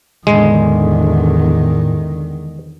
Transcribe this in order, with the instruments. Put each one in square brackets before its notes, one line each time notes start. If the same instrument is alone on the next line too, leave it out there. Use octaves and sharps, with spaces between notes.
[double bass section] E2 D3 [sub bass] A2 [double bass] D#3 [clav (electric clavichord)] G#3